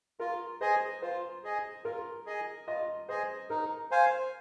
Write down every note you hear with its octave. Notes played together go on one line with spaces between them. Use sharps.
F4 A#4
G#4 C5 D#5 G#5
F4 C5
G#4 D#5 G#5
F4 A#4
G#4 D#5 G#5
F4 D#5
G#4 C5 D#5 G#5
D#4 A#4
C5 F5 G#5